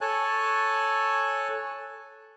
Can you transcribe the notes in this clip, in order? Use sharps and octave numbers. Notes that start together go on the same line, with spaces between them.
A4 C#5 G#5 A5 F#6